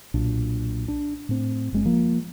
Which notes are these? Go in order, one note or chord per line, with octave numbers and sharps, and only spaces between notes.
B1 A#2 D4
D4
A2 C4
F#1 G#3 C4
F3 A#3